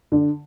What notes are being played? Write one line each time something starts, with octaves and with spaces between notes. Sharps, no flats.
D3